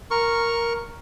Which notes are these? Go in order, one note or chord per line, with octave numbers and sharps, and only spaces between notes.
A#4 C#6